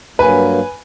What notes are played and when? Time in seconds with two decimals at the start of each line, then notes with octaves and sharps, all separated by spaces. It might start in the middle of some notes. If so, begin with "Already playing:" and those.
0.19 G2 F#3 A#3 B4 G#5